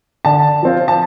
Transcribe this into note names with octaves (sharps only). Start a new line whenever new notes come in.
D3 A5
F3 C4 F4
A5